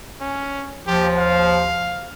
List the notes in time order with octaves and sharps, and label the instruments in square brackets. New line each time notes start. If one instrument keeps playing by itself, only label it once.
[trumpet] C#4
[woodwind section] D#2 F3 [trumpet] G4
[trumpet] F5